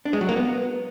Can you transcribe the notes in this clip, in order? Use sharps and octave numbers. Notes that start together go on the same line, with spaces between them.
D4
G#3
F#3
A#3
B3